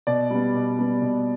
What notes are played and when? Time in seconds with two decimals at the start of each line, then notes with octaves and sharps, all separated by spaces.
0.07 B2 D5
0.31 G3 B3
0.54 B2
0.79 G3 B3
1.02 B2